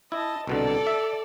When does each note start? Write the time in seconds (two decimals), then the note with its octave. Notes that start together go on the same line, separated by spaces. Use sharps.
0.12 E4 D#5 A5
0.47 C2 B2 D3 A4 D5
0.87 E5